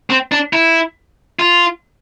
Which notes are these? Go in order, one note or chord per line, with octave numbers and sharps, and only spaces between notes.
C4
D4
E4
F4